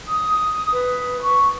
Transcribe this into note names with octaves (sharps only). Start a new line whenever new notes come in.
D#6
B4
C#6